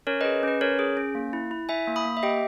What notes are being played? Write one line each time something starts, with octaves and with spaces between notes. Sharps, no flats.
C#4 A#4 C#5
B4 D#5
G#4
C#4 B4
C#4 A#4 C#5
G#4
C#4
A#3
E4
E4
E4 E5 G#5
A#3
B5 D#6
A#3
E5
G4 D#5 G5